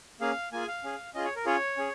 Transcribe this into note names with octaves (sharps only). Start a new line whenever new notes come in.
A#3 C#4 G#4 F5
A#3 F4 G#4 G#5
F5
C#4 G#4
C#4 F4 G#4 D#5
C#5
A#4
C#4 F4 G#4 C#5
C#4 G#4